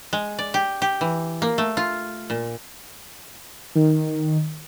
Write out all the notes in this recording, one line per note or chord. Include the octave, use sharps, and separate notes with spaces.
G#3
D5
G4
G4
E3
A#3
A3
F4
A#2
D#3